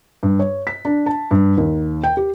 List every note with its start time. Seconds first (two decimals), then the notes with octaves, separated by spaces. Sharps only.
0.23 G2
0.39 C#5
0.67 B6
0.85 D4
1.06 A5
1.31 G2
1.58 D#2
2.04 G5
2.17 G4